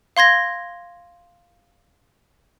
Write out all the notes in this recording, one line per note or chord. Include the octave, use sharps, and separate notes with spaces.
F5 C6 G#6 A#6